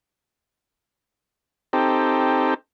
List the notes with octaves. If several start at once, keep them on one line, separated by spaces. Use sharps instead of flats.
C4 D#4 G4 A4